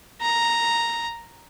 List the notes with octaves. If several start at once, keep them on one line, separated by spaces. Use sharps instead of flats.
A#5